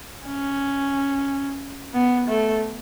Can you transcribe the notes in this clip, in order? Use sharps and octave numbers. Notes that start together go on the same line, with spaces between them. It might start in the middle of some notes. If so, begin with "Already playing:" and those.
C#4
B3
A3